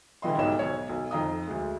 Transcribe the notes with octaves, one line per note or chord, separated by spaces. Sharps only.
D3 E3 G3 D#5 C6
B1 G#2 G4 C#5 D#5 E7
B1 C#5
B1
F2 D#4 D#5 A#5 D#6
D2 G#3